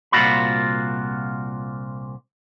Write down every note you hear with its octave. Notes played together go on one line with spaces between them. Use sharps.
C2 A#2 F3 F4 F#4 B5